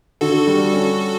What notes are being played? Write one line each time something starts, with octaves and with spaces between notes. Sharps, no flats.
D3 F#4 A4
G3
C#4